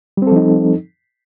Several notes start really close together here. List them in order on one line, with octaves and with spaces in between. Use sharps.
G3 C4 A4 F3 D#4